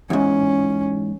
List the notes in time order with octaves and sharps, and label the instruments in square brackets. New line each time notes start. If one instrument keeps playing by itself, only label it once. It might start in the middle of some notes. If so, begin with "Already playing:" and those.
[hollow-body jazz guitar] E2 G#2 [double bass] C#4